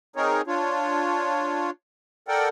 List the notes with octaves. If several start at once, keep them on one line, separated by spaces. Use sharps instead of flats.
C4 D#4 G#4 A#4 C#5
D4 F4 C#5
A4 A#4 D5 F#5 G5